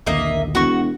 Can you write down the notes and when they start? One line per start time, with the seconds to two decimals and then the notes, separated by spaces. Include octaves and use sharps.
0.07 A#1 D#2 D3 A#3 D#5 E5
0.55 E1 F#4 C#6